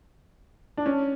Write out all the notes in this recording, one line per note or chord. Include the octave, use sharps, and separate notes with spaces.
D4
C#4